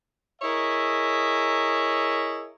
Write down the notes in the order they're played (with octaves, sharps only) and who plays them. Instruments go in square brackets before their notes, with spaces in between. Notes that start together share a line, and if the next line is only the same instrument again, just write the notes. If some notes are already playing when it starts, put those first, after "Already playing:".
[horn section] E4 G#4 A#4 C#5 D#5 E5